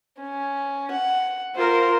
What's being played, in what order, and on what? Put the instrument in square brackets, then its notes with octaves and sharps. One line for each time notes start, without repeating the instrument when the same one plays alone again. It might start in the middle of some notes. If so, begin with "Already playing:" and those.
[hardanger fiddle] C#4
F#5
[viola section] F4 A#4 [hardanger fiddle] C5